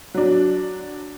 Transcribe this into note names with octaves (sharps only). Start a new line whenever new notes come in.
F#3 D4